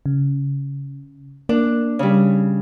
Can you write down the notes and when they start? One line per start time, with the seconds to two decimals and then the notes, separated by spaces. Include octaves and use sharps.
0.06 C#3
1.49 A#3 D4
1.99 C#3 G3